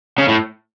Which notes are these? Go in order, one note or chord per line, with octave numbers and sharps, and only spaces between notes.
C#3
A2